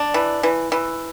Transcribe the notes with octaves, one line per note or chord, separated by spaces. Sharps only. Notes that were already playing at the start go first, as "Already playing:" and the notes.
Already playing: D4
E3
E3
E3